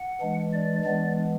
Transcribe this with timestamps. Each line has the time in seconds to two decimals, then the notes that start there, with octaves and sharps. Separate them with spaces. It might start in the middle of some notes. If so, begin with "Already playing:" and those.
Already playing: F#5
0.21 E3 G#3 D4
0.53 D5
0.85 E3 G#3 B3 D4 D5